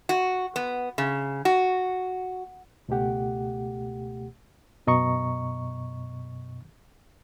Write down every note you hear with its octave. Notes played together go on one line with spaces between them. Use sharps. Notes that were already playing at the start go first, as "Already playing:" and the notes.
F#4
B3
C#3
F#4
C#2 B2 A3 G4 F#5
F#2 B2 D#5 A#5 C#6